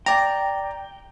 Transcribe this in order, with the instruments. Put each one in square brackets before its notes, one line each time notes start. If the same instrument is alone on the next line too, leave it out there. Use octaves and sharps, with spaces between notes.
[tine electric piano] D5 A#5 [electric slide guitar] G5